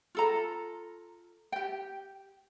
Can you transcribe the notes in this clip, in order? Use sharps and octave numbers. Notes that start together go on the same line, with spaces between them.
F4 A4 A#5
G4 G5